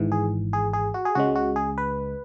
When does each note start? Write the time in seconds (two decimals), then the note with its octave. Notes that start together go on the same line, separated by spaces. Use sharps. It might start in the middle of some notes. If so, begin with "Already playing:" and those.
Already playing: G#1 G#2 E3
0.12 G#4
0.53 G#4
0.73 G#4
0.94 F#4
1.05 G#4
1.15 C#2 C#3 G#3 F#4
1.35 F#4
1.56 G#4
1.78 B4